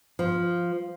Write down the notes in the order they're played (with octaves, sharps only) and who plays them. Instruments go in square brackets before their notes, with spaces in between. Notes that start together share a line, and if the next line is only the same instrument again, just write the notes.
[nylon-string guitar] F3